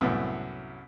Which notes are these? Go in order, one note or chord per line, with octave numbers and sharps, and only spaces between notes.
C2 F#2 A2 B3